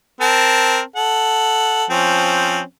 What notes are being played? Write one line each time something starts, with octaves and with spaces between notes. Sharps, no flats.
C4 A#4 A5
A4 F#5
F3 C4 C#4